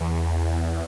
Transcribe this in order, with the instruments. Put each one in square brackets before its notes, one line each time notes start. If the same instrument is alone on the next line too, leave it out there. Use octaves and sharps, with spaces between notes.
[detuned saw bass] E2